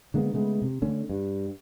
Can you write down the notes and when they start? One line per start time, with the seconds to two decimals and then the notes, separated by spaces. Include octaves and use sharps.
0.14 D3 G#3 A#3 B3
0.34 C#3 G#3 A3 B3
0.62 C3
0.82 D3 A3 C#4
1.09 G2